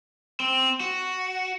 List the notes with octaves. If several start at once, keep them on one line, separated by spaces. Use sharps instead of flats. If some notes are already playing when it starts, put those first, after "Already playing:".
C4
F#4